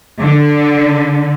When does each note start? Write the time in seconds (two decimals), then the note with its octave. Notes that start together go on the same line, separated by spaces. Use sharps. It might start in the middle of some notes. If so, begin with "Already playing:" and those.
0.20 D3